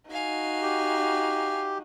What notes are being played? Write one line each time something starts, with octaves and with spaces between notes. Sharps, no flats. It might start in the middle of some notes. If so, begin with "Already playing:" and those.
D#4 F#4 F5 G#5
G4